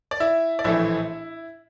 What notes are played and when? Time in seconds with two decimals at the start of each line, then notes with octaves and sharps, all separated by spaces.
0.11 D5
0.20 E4 E5
0.59 D5
0.64 A#1 A2 E3 A3 E4 E5